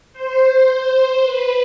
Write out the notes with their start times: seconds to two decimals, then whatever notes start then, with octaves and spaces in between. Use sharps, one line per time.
0.13 C5
0.68 C5
1.22 B4